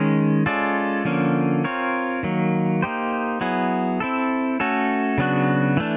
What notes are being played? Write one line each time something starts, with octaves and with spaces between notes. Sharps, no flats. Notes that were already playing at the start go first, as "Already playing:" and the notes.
Already playing: D#3 G#3 C#4
G#3 C#4 F4 A4 D5
D3 F3 A#3 C#4
C4 F4 A#4 C#5
D#3 F#3 A#3
A#3 D#4 G4 C5
F#3 B3 E4 G#4
C4 E4 A4
A3 C#4 F#4 A4
C#3 F#3 B3 D4 F#4
E3 A3 D4